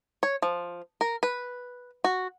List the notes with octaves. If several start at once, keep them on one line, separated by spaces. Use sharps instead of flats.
C#5
F3
A#4
B4
F#4